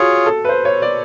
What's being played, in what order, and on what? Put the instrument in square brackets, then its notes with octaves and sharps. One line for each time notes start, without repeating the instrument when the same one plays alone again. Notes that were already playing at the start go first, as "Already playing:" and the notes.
Already playing: [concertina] F4 G#4 C#5 [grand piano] F#4
[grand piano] A4
B4
C5
C#5
D5